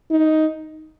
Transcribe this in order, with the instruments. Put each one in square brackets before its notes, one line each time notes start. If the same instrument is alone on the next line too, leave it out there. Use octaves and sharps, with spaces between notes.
[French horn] D#4